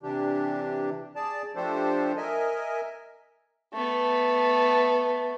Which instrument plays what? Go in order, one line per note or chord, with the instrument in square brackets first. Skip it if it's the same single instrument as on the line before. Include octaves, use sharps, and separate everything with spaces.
[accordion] C3 E3 D4 G4
G#4 D5 A5
F3 A3 D4 G4 A4 C5
A#4 D#5 E5 G#5
[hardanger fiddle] A3 B3